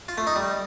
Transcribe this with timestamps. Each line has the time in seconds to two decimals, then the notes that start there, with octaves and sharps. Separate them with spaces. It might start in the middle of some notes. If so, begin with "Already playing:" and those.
0.08 F4
0.18 A3
0.27 D#4
0.36 G3